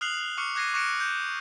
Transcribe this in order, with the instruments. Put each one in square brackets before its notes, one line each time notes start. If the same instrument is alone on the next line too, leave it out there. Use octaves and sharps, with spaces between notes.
[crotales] D#6 F6 F#6 C7 F7 F#7
C#6 D6 F6 C7 C#7
D6 F#6 G#6 A#6 C7 D#7
C#6 D6 F#6 A#6 C#7 D7
G6